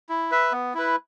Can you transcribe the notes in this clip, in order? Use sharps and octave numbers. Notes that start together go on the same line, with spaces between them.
E4
B4 E5
B3
E4 B4